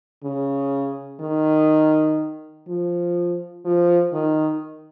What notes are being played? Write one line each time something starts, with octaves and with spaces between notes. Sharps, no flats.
C#3
D#3
F3
F3
D#3